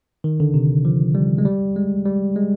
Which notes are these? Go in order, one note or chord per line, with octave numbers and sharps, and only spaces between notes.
D#3
D3
C3
F3
G3
G#3
G3
G#3
G3
G#3